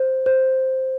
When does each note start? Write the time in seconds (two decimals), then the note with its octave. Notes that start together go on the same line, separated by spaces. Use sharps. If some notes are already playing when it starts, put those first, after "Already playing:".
Already playing: C5
0.26 C5